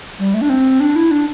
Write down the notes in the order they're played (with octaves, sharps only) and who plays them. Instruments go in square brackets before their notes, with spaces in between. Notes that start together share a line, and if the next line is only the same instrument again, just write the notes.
[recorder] G3
A3
D4
C4
D4
E4
D4